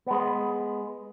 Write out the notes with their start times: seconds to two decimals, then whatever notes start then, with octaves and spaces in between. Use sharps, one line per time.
0.07 G#3 B3